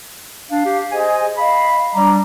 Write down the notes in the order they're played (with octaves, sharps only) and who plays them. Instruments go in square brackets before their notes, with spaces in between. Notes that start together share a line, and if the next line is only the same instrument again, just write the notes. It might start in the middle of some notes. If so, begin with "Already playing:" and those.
[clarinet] D4 [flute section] F5
[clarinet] G4
[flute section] G#4 C5 D#5 [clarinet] G#5
[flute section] D#5 F5 [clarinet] B5
[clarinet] G3 [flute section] D4 A#5 D6